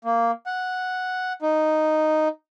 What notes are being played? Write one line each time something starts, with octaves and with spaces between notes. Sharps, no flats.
A#3
F#5
D#4